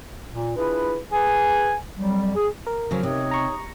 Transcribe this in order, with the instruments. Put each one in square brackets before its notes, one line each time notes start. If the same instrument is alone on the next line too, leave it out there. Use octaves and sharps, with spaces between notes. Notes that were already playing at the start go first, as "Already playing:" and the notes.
[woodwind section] A#2
D4 E4 F4 G#4 B4
G#4 B4 G#5
F2 F#3 G3
G#4
[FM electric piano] A#4
[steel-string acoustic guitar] C#3 F3 F#3
[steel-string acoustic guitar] C3 [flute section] D#4 C#5 D#6
[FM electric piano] A#5 C#6